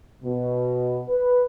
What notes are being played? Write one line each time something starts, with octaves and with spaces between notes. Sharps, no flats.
B2
B4